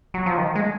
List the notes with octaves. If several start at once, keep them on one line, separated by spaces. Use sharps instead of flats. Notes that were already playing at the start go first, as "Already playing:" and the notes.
F#3
F3
D#3
G#3